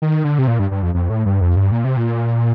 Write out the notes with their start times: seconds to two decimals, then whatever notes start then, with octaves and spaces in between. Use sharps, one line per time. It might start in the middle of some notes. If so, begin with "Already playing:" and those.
0.02 D#3
0.24 D3
0.38 C3
0.48 A#2
0.59 G2
0.71 G2
0.83 F2
0.94 F2
1.10 A2
1.26 G2
1.41 F2
1.56 G2
1.72 A#2
1.84 C3
1.97 A#2